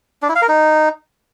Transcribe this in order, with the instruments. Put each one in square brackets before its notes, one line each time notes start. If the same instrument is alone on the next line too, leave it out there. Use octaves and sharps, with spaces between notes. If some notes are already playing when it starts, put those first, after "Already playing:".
[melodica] D4
E4
F5
A#4
D#4